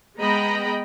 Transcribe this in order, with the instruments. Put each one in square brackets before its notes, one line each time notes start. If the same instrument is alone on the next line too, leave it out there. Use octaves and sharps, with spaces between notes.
[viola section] G#3 B3 D#5 G5 A#5 B5